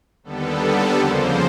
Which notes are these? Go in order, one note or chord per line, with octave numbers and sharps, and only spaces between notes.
D#2 D3 G3 B3 A4
F2 C#3 F3 A#3 C5